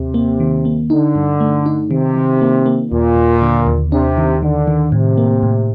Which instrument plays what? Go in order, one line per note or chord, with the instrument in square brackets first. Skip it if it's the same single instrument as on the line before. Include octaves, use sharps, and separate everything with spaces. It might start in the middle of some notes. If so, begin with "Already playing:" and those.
Already playing: [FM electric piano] D#2 [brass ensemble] C3
[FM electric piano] A#3
D#3
A#3
[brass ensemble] D3 [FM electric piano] D#4
[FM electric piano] G2
A3
D#4
[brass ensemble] C3 [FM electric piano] D#3
[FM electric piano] D#3
A#3
A#3
[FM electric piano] D#2 [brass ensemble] A#2
[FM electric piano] D#2
D3
D#2
[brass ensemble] C3 [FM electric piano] D4
[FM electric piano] D#3
[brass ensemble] D3 [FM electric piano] D#3
[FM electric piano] D#3
[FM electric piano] A2 [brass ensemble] C3
[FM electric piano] A#3
A2